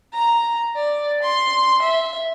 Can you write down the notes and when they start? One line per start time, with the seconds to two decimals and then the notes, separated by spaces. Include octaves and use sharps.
0.13 A#5
0.76 D5
1.22 C6
1.82 E5